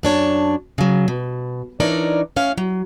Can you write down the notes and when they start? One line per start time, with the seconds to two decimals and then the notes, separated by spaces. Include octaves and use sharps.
0.03 F#2 D4 C#5 A5
0.78 C#3 F#3
1.08 B2
1.80 E3 D4 D#4 A#4 C#5 D5
2.36 A2 C#4 F5
2.58 F#3